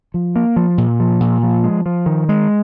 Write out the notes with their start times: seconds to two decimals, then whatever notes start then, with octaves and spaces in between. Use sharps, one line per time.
0.14 F3
0.36 A#3
0.56 F3
0.78 A#2
1.00 F3
1.20 A#2
1.43 F3
1.64 G#3
1.86 F3
2.06 D#3
2.29 G#3